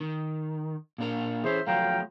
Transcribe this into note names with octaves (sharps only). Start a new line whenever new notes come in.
D#3
A#2 D4 A#4
E3 C#4 G#4 C5 E5
F3 F#3 A3 F5 G5 A#5